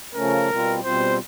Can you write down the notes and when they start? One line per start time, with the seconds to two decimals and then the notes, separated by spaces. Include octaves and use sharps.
0.15 C#3 F3 A3 C#4 A#4
0.49 B2 G3 C4 F4
0.84 B2 G3 C4 F4 C5